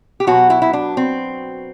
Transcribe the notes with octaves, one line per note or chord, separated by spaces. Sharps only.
G4
B2 F#3 B3 F#4
E4
E4
D4
C4